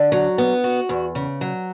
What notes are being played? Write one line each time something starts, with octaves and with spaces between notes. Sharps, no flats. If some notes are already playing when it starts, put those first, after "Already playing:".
Already playing: D3
F#3
B3
F#4
E2
C#3
F#3